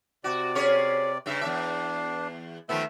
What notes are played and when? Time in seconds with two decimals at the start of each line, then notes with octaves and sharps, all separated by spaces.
0.24 C3 F#4 D5
0.55 C#4 G#4 C#5
1.26 G2 C#3 E5
1.41 E2 A2 D4 E5
2.69 D#3 F3 A3 B3 E5